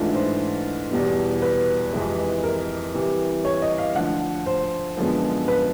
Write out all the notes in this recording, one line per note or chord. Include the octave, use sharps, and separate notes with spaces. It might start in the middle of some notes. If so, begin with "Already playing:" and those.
Already playing: G#2 E3 A3 D4 F4
C5
E2 B2 G3 B3
B4
F2 C3 E3 G#3
A#4
C3 E3 G3
C#5
D#5
F5
D2 D3 F3 F#5
C5
F#2 D3 F3 G#3 B3
B4